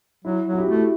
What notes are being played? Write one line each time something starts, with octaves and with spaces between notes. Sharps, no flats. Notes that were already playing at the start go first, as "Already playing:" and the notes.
F#3 E4
F#3
F#4
E4 G4
A3 F#4
E4 G4